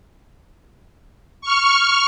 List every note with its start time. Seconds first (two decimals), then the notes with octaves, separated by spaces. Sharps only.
1.41 C#6 F6